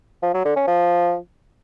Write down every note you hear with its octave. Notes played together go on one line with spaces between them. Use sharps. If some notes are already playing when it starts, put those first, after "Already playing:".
F3
F#3
D3
C#4
F3